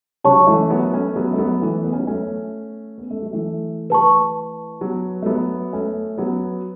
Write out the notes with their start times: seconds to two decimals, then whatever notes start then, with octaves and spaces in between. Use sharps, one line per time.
0.24 C#3 F#3 C#5 A5 C#6
0.38 F#3
0.47 E3 A3
0.70 F#3 B3
0.83 B3
0.93 A3 C#4
1.16 F#3 B3
1.33 A3
1.38 F#3 B3
1.62 E3 A3
1.84 B3
1.92 C#4
1.99 F#3 B3
2.07 A3 C#4
2.98 B3
3.11 A3
3.22 F#3
3.33 E3 A3
3.90 B4 A5 C#6
4.81 F#3 B3
5.22 A3
5.26 F#3 B3
5.73 A3 C#4
6.18 F#3 B3